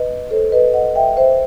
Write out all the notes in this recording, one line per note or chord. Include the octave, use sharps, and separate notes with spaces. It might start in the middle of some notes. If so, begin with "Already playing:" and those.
Already playing: B4 D#5
A4 C5
B4 D#5
D#5 F#5
E5 G5
C5 E5